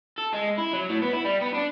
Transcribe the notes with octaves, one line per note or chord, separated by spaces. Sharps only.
A4
G#3
E4
F#3
A2
B3
E4
G3
B3
D4